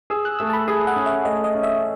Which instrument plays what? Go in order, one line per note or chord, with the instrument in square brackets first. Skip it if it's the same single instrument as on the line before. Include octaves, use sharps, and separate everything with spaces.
[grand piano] G#4 [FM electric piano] E6
[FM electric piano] F#6
[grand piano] A3 [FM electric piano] E6
[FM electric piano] A5
B5
[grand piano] G#4 [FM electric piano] G#5
[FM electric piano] F#5
[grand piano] C#4
[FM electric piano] E5
[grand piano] A3 [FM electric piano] D#5
[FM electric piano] D#5
[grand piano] C#4
[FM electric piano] E5